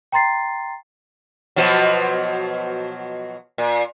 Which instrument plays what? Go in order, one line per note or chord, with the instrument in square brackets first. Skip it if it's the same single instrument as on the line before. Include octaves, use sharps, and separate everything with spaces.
[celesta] G5 A#5 C6 A6 C7
[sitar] B2 F3 F#3
A#2